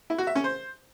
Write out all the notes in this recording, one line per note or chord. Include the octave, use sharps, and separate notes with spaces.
E4
F#4
E5
C#4
C5